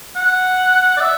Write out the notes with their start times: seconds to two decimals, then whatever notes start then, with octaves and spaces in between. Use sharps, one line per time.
0.16 F#5
0.97 D5
1.01 E5